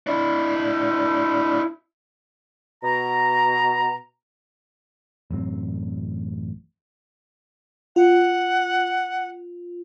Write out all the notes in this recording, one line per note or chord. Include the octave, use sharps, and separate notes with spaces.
D4 E4
B2 A#5
A1 F#2 F#3 C4
F4 F#5